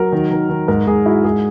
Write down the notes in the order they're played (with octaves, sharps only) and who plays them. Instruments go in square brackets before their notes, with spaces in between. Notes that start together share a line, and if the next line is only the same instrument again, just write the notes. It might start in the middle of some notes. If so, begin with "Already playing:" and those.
Already playing: [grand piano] F#3 A#4
D#3
D#3
D#3
G#2 A#4
G#2 G#4
E4 F#4
G#2 G#4